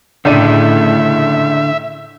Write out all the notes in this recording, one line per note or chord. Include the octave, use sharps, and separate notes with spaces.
C#2 A2 D3 D4 E5 D#7